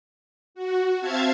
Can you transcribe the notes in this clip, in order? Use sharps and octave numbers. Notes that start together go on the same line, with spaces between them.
F#4
C4 C5 E5 F5 A5 G#6